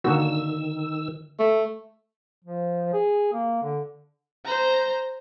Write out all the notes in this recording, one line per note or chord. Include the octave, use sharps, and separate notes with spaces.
D3 D#3 A#3 F#4 E6
A3
F3
G#4
A#3
D3
C5 A#5